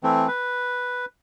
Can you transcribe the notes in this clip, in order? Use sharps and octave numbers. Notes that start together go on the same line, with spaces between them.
E3 A3 C4
B4